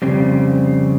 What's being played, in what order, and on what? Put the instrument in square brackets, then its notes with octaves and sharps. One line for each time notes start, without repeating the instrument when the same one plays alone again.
[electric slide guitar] F2 C#3 G3 C4